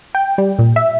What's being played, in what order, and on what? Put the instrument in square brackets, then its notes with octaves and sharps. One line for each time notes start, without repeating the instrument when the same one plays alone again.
[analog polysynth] G5
G3
A#2
E5